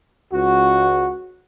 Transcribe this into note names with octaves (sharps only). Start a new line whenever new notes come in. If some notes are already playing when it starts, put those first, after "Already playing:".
C#2 F#4